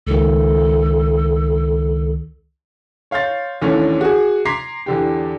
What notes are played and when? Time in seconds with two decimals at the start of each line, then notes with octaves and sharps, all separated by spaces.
0.07 C#2 D#3 A4
3.11 C#5 F5 C6 G6 A6
3.62 D#2 D3 E3 A3 C#4
4.01 F#4 G#4
4.45 A#5 C6 D6 G#6 B6 C7
4.86 E2 D3 G4